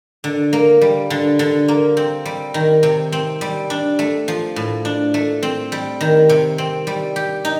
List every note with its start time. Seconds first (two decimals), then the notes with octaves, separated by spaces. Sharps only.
0.24 D3
0.53 A#3
0.81 G3
1.10 D3
1.39 D3
1.68 A#3
1.97 C4
2.25 G3
2.54 D#3
2.83 C3
3.12 C4
3.41 G3
3.70 D4
3.99 A3
4.28 F3
4.56 A2
4.85 D4
5.14 A3
5.43 C4
5.72 G3
6.01 D#3
6.29 C3
6.58 C4
6.87 G3
7.16 G4
7.45 D#4